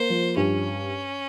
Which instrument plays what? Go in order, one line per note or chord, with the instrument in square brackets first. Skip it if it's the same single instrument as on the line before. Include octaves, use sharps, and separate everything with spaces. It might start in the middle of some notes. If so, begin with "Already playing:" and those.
Already playing: [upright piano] A#3 [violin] C5
[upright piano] F3
[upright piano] G2 [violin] C#4